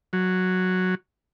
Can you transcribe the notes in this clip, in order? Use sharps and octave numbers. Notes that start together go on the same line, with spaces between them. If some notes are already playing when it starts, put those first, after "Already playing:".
F#3